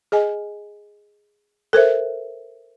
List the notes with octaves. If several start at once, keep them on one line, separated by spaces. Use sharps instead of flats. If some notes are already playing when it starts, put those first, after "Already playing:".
G#4 D#5 G#5
A4 A#4 C5 E5